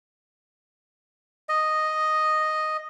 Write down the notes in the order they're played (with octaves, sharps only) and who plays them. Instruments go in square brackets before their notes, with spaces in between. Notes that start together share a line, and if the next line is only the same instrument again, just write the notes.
[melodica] D#5